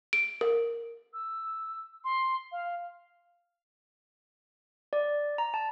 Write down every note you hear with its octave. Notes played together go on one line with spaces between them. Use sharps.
D7
A#4
E6
C6
F5
D5
A#5
A5